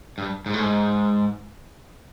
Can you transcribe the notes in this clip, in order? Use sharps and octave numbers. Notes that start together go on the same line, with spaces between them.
G2
G#2
A2
G#2